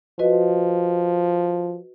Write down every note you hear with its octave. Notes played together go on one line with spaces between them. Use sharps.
F3 F#4 B4 D#5